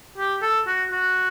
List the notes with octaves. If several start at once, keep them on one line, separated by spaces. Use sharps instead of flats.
G4
A4
F#4
F#4